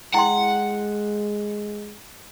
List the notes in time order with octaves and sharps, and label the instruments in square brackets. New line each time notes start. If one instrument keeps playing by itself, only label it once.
[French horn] G#3 [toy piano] E4 G5 C6 [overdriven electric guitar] F#5